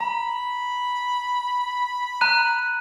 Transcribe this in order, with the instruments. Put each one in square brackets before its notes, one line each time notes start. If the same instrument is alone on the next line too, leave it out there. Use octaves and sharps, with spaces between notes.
[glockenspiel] A#5 [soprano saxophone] B5
[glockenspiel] A#5 F#6 D#7